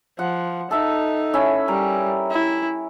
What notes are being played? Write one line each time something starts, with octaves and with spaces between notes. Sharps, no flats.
F3 F#5
D#4 A4 E5
C#4 E4 E5
G3 A#4
E4